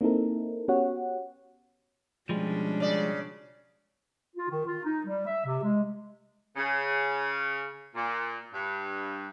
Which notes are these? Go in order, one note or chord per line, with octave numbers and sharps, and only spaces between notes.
A#3 C4 D#4 E4 A4 A#4
B3 C#4 F#4 G4 C#5 F#5
B2 F3 G3 G#3 C#4 D4
C#3 D5
F4
D#3
F4
D#4
G3
E5
C3
G#3
C#3
A#2
G2